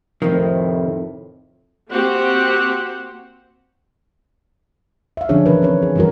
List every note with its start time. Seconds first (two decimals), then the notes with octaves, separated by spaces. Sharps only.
0.22 F2 A2 C3 D#3 F3
1.91 A#3 C4 F#4 G4 C5 F#5
5.17 E5 F5
5.29 D3 F3 C#4 D4 G#4 C#5
5.46 D#3 E3 C#4 D4 A#4 B4
5.62 D#3 C4 C#4 C#5
5.82 G#4
5.96 E3 G3 E4 F#4 A#4